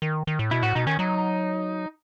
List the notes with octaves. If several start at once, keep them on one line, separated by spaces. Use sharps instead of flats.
D#3
D#3
A2
B2 E4
A2 F#4
B2 D#4
D#3 C#4
F#3 D#4